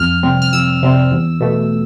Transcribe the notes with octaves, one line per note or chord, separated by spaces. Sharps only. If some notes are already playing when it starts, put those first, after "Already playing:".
Already playing: F2 F6
C3 G3 C4
F6
F2 E6
C3 G3 C4
E2
B2 A3